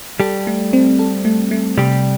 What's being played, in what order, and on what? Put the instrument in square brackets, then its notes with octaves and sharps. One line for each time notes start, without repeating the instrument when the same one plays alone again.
[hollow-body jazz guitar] G3 G4 [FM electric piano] A4
[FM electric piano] A3
C4
A4
A3
A3
[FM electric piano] C3 [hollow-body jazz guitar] G3 G4